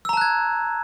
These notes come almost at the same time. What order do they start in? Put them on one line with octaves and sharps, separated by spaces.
E6 A#5 A5 F#6 G#6